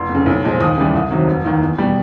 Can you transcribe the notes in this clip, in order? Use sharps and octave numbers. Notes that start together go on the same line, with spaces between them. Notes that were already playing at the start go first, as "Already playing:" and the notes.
Already playing: F1 C6
F2
C#3
B1
A#2 F3 G#3
D#2 D#6
C#3 E3 G3
C2
C3 D#3 F#3
F1
D#2 D#3
E2
B2 G3